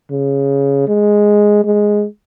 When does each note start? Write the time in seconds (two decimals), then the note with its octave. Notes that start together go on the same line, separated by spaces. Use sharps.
0.12 C#3
0.88 G#3
1.64 G#3